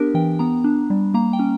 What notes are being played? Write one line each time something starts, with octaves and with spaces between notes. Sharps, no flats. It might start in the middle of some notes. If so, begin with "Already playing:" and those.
Already playing: B3 D4 G4 A#4
E3 G5
B3 A#5
D4
G3
A#3 A#5
G5
C#4